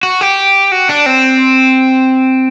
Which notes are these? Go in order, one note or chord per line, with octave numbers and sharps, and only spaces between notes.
F#4
G4
F#4
D4
C4